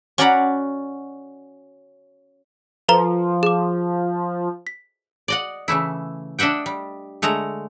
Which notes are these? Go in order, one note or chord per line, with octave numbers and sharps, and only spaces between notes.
C#4 F#4 D5 F#5 A#5 B5
F3 A4 B4 A#5
G#4 D6
B6
D5 D#5 F#5
C#3 E3 A3 E4
D4 D#5 E5 F#5 G5
G3
D3 G#3 A3 A#5